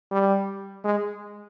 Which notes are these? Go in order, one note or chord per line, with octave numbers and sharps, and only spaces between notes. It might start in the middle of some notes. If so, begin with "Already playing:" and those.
G3
G#3